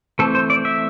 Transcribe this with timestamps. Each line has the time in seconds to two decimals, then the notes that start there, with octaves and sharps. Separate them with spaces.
0.19 E3 A3 C4 A4
0.35 C5
0.50 D5
0.65 E5